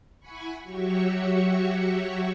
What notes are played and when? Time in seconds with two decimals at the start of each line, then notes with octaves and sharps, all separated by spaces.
0.19 E4 F#5 G#5 B5 C#6
0.63 F#3 F#4 G4 C#5 E5 C#6